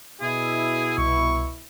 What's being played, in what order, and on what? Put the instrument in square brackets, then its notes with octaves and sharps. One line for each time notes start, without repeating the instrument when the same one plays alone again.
[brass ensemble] B2 E4 [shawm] G#4
[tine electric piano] C2 [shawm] C#6